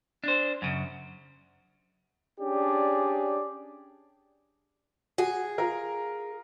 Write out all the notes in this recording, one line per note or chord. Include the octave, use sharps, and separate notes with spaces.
D4 C5
F#2 C#3
C#4 D4 G4 G#4 D5
F#4 G#4
F4 A#4